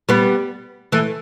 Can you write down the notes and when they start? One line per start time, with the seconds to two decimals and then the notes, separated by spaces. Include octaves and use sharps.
0.09 G3 B3
0.92 E3 A3